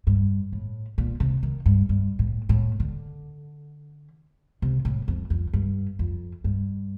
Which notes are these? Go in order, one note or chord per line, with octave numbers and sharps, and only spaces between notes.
G2
A2
A#2
C3
D#3
G2
G2
A2
A2
D3
C3
A2
F2
F2
G2
F2
G2